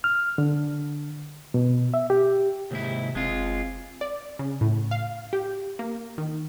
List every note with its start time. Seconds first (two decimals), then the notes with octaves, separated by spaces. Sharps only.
0.04 F6
0.38 D3
1.54 B2
1.94 E5
2.10 G4
2.71 D#2 G#2 C3 E4
3.15 F#1 G#3 C4 F4 G#5 G#6
4.01 D5
4.39 C#3
4.61 A2
4.91 F5
5.33 G4
5.79 A#3
6.18 D#3